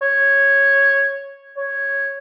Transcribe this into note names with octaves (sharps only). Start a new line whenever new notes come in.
C#5
C#5